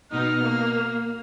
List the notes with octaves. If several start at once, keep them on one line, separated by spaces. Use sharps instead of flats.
B2 D#4 F6
A#3